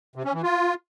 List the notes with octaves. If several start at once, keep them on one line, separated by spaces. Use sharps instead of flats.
C3
C#4
E3
F4